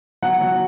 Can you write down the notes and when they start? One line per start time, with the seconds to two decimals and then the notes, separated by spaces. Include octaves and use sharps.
0.22 F#3 F#5
0.41 F#3